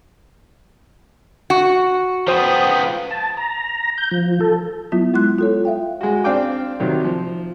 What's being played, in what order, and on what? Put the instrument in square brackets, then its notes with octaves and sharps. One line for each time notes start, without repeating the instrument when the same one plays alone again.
[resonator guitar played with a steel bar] F#4
[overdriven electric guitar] F3 B3 [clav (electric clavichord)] C5 [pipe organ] G5 D#6
[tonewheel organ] A5
A#5
G6
F3
A4
[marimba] F#3 B3 E4 F4
G#3 E4 C6 F#6
F4 A4 C#5
E5 F5 G5
[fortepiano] G#3 F#4
C4 D4 F5 G5 D6
C3 D#3 F#3
F3